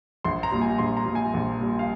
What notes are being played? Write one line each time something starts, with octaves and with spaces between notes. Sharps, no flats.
A#1 C6
A#5
A#2 G3
G#5
A#1 C6
A#5
A#2 G3
G#5
A#1
A#2 G3
F5